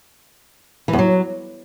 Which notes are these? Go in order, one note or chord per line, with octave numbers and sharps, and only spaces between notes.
E3
E2
F#3